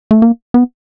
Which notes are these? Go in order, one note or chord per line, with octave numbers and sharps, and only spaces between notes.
A3
A#3
B3